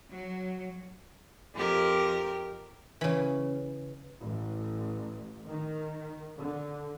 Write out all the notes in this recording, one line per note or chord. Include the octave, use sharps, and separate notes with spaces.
F#3
F2 G4 A#4
C#3 E3
A1
D#3
D3